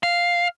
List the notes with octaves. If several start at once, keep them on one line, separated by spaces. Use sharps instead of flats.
F5